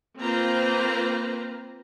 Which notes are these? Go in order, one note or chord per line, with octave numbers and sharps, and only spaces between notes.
A#3 C4 F4 B4 C5 A#5